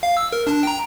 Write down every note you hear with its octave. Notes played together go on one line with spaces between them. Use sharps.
F5
E6
A#4
D4 A5
G5 A#5